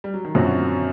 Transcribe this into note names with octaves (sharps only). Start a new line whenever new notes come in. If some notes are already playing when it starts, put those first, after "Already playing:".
G3
F#3
D#3
F#2 A#2 D3 F#3 C4 F#4